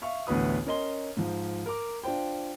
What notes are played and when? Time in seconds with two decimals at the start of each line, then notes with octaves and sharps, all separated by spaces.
0.02 E5 F5 C#6
0.27 A1 D2 B3 B4 D#6
0.66 C#4 A#4 D#5 C6 G7
1.17 G#2 F3
1.66 A#4 D6
2.03 D4 F4 C5 G5